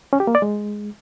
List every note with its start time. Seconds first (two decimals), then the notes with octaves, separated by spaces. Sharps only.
0.13 C#4
0.20 G4
0.27 A#3
0.35 D5
0.42 G#3